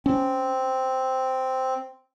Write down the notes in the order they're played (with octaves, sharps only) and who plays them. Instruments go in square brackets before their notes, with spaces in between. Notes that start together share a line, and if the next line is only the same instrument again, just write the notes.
[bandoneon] C4 [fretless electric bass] C#4